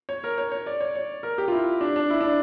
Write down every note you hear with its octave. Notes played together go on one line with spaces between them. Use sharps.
C#5
A#4
C#5
C#5
D5
C#5
C#5
A#4
G4
F4
E4
D4
D4
E4
D4